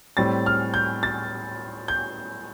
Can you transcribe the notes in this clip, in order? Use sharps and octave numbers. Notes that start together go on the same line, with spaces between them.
A2 G3 C4 A6
F6
G6
A6
G6